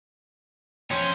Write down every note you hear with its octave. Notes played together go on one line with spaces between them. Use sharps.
F2 C#4 C5